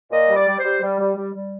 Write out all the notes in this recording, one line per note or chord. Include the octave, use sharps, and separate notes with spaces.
A#2 D#5
G3
D5
G3
C5
G3
G3
G3
G3
G3